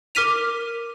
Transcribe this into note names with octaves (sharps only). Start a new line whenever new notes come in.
A#4 D6 F6 B6 D#7 F7